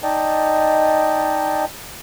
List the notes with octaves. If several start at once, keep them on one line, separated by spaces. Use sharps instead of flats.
D#4 D5 D#5 G5 A5